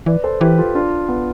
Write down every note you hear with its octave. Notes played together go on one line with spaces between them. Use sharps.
E3 B4 D5
A4 C5
E3 G4 B4
F4 A4
D4 F4
B3